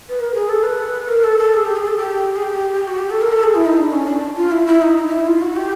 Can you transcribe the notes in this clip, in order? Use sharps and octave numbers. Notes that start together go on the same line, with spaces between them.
B4
A#4
G#4
A4
B4
A#4
A4
A4
G#4
G4
G#4
A4
G4
G#4
G4
F#4
G4
A4
A#4
A4
G#4
E4
D#4
D4
C#4
D4
F4
E4
E4
D#4
D#4
D#4
E4
F4
F#4
G4